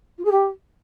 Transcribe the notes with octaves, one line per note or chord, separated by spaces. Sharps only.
F4
G#4
G4